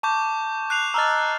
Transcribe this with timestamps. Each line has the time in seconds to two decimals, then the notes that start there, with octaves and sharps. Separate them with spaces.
0.03 A5 C#6 D6 G6
0.70 F#6 C7 F7
0.94 D#5 A5 A#5 E6 F6 A6